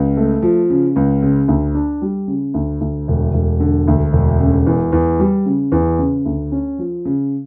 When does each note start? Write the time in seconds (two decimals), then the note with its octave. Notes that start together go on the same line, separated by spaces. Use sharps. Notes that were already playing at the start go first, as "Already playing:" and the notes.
Already playing: C#2
0.17 A3
0.42 F3
0.70 C#3
0.96 C#2
1.22 C#3
1.48 D2
1.75 D4
2.02 G3
2.28 C#3
2.54 D2
2.81 D2
3.08 E1
3.34 E1
3.60 D3
3.88 D2
4.13 E1
4.40 C#3
4.66 E2
4.92 E2
5.20 G3
5.46 C#3
5.72 E2
5.99 C#3
6.25 D2
6.52 C#4
6.79 F3
7.05 C#3